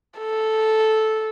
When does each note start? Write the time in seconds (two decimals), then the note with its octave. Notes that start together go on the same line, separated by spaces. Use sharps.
0.19 A4